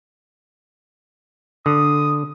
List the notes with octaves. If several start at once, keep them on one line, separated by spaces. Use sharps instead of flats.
D3 D#6